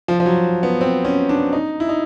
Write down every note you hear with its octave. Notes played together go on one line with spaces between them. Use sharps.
F3
F3
F#3
B3
C4
C#4
D4
D#4
E4
D#4